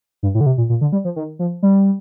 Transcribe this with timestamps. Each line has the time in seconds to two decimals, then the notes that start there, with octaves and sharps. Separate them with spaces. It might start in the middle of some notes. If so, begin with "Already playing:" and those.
0.23 G2
0.35 A2
0.41 D3
0.46 C3
0.58 A#2
0.69 A#2
0.81 D3
0.92 G3
1.05 F3
1.16 D#3
1.39 F3
1.63 G3